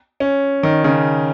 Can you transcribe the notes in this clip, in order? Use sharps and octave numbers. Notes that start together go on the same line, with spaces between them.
C#4
D#3
C#3